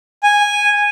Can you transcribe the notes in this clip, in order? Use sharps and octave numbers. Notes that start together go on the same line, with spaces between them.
G#5